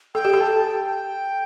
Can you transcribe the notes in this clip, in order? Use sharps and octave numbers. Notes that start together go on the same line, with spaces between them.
A4 G5
G4
A4
A5
G5